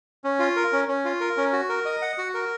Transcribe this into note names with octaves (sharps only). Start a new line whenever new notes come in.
C#4
F4
A#4
C#4
C#4
F4
A#4
C#4
F#4
A#4
D#5
F#5
F#4
A#4